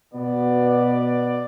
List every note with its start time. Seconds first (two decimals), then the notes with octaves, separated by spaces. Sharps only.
0.14 B2 B3 D5